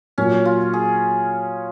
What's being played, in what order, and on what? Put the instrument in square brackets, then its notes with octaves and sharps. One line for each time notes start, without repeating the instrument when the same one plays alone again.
[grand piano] A#2 F#3 A#3 [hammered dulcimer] C#4
[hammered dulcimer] F4
G#4